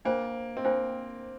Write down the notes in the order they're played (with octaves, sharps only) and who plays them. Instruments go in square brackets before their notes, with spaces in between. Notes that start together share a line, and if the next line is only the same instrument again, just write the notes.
[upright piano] A#3 [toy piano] D4 F4 C5 G5
[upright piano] C4
[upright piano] A#3 [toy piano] D4 F4 C5 G5